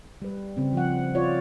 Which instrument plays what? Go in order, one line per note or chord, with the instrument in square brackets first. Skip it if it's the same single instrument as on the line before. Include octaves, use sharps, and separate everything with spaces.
[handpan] G3 B4
C#3 C4
F3 F#5
F4 C#5 D5